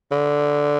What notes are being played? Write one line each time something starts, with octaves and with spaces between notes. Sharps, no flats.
D3